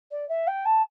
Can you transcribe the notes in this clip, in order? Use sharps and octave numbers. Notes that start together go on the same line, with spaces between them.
D5
E5
G5
A5